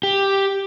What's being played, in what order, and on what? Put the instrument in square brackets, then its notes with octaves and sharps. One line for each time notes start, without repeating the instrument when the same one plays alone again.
[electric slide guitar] G4